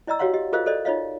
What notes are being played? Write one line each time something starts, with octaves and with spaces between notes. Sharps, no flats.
E4 D5 D#5 A#5 E6
F#4 G4 C#5 F5 F#5 C6
G4 D#5
F4 G#4 A#4 C5 D#5 F5
A4 C5 D5 D#5
D#4 F4 C#5 D#5 F5